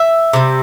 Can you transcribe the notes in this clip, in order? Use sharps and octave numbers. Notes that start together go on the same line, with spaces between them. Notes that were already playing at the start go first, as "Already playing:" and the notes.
Already playing: E5
C3 G3